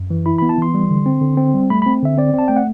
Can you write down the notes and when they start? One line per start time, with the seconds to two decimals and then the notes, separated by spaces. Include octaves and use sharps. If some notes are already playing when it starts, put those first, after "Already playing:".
Already playing: F#2
0.10 E3
0.26 E4 B5
0.38 B3 B5
0.49 A5
0.58 E3 C6
0.74 G3
0.90 D3
1.06 C4
1.21 D3
1.37 C4
1.54 G3
1.70 A3 B5
1.82 C4 B5
2.02 D3 E5
2.17 C4 D5
2.34 C4 A5
2.48 A3 G5
2.56 F#5